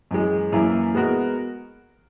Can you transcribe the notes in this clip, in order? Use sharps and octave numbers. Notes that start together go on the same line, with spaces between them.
F#2 E3 G#3
F#2 E3 A#3 E4
G#3 B3 F#4 A#4